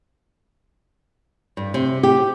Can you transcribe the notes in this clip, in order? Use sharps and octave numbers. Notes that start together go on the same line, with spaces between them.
G2
C3
G4